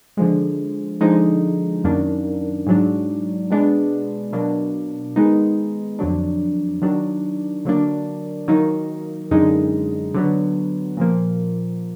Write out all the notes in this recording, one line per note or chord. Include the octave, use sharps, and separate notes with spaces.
D3 F3 G#3
D3 F3 G#3 D#4
F#2 D#3 A#3 D4
G#2 F#3 D4
B2 G#3 B3 D4
B2 F#3 A#3 D4
D#3 G#3 B3 D#4
F2 D3 F#3 D4
D#3 F#3 D4
D3 F#3 A#3 D4
D#3 F#3 A#3 D#4
F#2 D3 G#3 D#4
D3 F#3 B3
A#2 F3 A#3